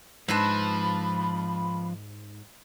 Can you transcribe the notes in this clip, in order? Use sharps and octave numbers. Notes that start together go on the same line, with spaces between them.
G#2 F3 C4 D4 B4 A5 B5